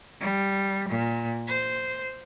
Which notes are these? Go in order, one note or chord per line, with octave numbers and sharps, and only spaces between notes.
G3
A#2
C5